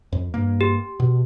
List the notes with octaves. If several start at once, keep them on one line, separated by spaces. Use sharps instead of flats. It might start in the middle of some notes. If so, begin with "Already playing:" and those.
F2
G2 A#3
G4
B2